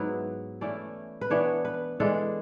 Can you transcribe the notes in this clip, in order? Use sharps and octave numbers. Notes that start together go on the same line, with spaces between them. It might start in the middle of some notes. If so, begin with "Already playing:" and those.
Already playing: G#2 F#3 B3 E4 B4
E3 A3 C#4 E4 D5
B4
E3 B3 D4 C#5
B4
E3 G#3 D4 A4